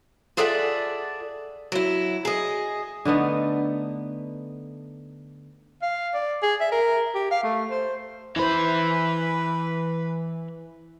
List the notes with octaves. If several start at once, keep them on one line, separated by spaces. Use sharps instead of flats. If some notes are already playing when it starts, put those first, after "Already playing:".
F4 G#4 A4 D5 E5 F#5
F#3 E4
G#4 D#5
D3 A3 B3 D#4
F5
D5
G#4
E5
A#4
G4
F5
A3
C5
E3 E4 B4 C5 B5